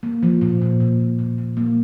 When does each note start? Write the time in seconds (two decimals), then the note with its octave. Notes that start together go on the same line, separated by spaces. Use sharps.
0.03 A#3
0.23 F3
0.41 A#2
0.61 A#2
0.80 A#2
1.00 A#2
1.19 A#2
1.38 A#2
1.57 A#3